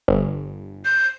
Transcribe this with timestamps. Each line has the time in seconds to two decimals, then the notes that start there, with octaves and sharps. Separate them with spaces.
0.08 G1
0.85 G6